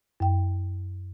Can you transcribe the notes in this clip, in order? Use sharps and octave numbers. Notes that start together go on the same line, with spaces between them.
F#2 G5